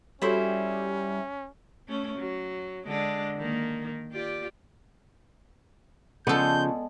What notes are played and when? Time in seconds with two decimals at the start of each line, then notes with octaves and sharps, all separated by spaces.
0.22 G3 C#4 E4 F#4 A4 C5 C#5
1.88 A3 C#4
2.18 F#3
2.87 D3 G#3 D4
3.37 D#3 A#3
4.12 F4 G4 D5
6.27 C#3 F3 G#3 B3 A4 D5 G6